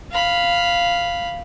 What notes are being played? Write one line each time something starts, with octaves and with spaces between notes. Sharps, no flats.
F5 B5